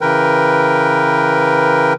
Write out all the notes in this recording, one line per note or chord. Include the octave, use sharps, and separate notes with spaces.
C#3 E3 A#4 B4 G5